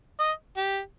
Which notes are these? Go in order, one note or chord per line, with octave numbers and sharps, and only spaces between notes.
D#5
G4